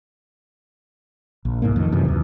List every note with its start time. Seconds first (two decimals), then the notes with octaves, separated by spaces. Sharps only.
1.45 A#1
1.62 C2 G#2 A#3
1.76 F2 D#3
1.92 F#2 C3 E3
2.08 D#2